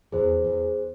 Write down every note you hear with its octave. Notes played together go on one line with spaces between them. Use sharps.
E2 G#4 C5
E2